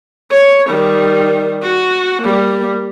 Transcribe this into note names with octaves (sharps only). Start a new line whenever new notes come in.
C#5
D#3 G3
F#4
G3 A#3